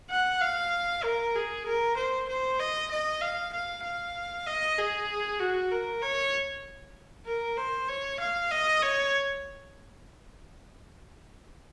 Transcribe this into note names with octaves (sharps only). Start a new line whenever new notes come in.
F#5
F5
A#4
G#4
A#4
C5
C5
D#5
D#5
F5
F5
F5
D#5
G#4
F#4
A#4
C#5
A#4
C5
C#5
F5
D#5
C#5